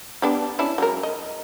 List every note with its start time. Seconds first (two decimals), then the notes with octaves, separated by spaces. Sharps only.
0.22 B3 D4 G4
0.59 C#4 D4 E4
0.78 F#3 G#3 A#4
1.03 D#5